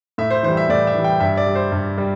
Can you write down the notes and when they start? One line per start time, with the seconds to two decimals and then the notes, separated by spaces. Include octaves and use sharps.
0.18 A2 E5
0.30 C5
0.43 E3 G3 C5
0.57 E5
0.69 A2 D5
0.87 E5
0.95 E3 G3
1.04 G5
1.20 G2 E5
1.37 D5
1.47 G3
1.55 C5
1.72 G2
1.98 G3